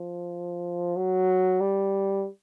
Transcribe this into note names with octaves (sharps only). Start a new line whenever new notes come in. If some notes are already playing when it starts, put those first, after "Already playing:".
Already playing: F3
F#3
G3